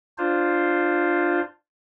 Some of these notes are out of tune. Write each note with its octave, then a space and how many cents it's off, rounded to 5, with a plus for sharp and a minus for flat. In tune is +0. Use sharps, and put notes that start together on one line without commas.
D4 +15 F4 +0 C5 +0